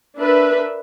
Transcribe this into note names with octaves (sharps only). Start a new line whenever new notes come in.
D4 A#4 B4 E5